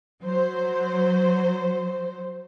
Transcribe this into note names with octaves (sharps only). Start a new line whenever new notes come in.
F#3 C5